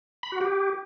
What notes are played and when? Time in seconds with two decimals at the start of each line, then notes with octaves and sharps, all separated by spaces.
0.23 B5
0.32 F#4
0.41 G4